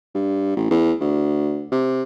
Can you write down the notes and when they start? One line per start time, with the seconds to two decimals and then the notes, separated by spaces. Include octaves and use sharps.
0.15 G2
0.56 A1
0.71 E2
1.01 D2
1.72 C3